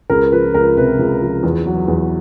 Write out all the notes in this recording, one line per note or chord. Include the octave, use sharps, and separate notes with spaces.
C#2 A#4
F3 B4
C#2 A#4
C3 B4
C#2
F3
E2
F#3
E2